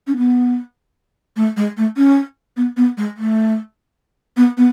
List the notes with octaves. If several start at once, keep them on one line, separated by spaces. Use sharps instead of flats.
C#4
B3
A3
G#3
A3
C#4
B3
B3
G#3
A3
B3
B3